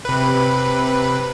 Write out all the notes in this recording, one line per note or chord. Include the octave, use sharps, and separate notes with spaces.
C3 B4